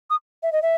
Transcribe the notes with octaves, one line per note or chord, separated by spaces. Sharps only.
D#6
E5
D#5
E5